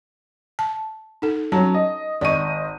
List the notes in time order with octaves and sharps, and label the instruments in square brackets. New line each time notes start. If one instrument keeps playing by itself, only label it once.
[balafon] A5
D#4 A4
[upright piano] F#3 C#4 [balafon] A5
[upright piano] D#5
[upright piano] G#1 D#5 D#7 [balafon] D5 C#6